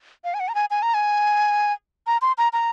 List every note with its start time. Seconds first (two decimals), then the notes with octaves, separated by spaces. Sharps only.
0.24 F5
0.34 G#5
0.40 F#5
0.48 A#5
0.55 G#5
0.70 G#5
0.82 A#5
0.94 G#5
2.07 A#5
2.22 C6
2.38 A#5
2.53 A#5